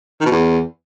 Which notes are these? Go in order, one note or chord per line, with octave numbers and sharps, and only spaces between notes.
D#3
B2
E2